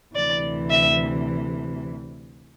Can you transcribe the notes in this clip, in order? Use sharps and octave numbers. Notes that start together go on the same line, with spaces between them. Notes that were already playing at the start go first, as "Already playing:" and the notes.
D2 C3 E3 D5
E5